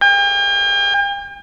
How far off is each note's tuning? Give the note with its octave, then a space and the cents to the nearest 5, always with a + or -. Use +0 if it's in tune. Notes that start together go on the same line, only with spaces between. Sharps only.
G5 +45